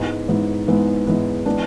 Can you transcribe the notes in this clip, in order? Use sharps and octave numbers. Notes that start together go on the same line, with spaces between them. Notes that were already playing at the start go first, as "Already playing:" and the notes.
Already playing: G#2 G#3 B3 E4
G#2 G#3 B3 E4
G#2 G#3 B3 E4
G#2 G#3 B3 E4
E3 G#3 B3 D4